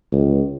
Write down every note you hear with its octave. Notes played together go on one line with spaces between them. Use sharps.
C#2